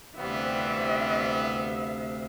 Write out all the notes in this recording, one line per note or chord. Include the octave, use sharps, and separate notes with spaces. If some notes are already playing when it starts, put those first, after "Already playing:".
D2 C3 E3 G3 B3 C4 E5 F5